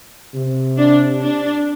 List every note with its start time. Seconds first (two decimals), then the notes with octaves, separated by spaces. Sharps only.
0.35 C3
0.77 D4
1.21 D4